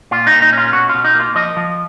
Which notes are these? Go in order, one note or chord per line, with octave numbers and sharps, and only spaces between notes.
A#2 F4
D#4
A#2
D#4
C#4 F4
B2 F#4
B2 F4
D#4
A#3 F4
F3 D#5
F3